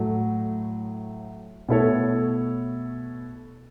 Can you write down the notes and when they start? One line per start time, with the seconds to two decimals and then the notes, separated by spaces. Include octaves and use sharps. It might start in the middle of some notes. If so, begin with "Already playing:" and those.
Already playing: A2 F#3 A3
1.69 B2 A3 E4 A4 C#5